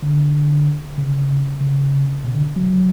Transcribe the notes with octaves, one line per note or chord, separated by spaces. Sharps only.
D3
C#3
C#3
B2
D3
F#3